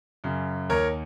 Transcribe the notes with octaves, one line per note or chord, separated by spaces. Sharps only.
F#2 C#3
D#2 A#4 C#5